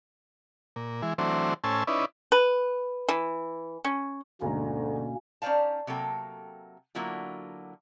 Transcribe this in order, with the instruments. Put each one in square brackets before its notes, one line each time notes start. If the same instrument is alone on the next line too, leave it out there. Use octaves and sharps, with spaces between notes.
[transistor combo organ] A#2
E3 G#3
E3 F#3 A3 C4 D4 C5
A2 C#4 C5 G#5 A5 E6
C#4 D#4 E4 B4 D5
[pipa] B4
E3
C#4
[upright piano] D2 G#2 A#5 [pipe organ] B2 A#3 C#4 [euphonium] D3
[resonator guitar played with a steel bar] C#4 D#4 C5 D5 F5 A5
C3 F#3 A#3 A4 G5
D3 F#3 A#3 E4 F4